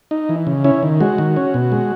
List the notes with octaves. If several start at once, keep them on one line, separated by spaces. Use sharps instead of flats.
D#4
E3
C#3
C#4 E4
D#3
G#3 F#4
D#3
C#4
B2
G#3